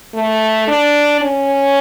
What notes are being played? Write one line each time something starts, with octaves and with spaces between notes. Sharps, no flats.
A3
D4
C#4